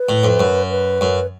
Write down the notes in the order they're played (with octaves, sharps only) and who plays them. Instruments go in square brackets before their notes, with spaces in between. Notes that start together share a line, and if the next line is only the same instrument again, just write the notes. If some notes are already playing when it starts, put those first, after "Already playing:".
Already playing: [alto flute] B4
[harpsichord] A2
F2
F#2
[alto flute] B4
[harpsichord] F#2